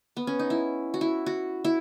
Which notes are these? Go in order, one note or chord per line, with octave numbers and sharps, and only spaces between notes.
B3
C#4
D#4
E4
F#4
E4
F#4
E4